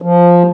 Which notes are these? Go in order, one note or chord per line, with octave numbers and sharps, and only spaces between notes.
F3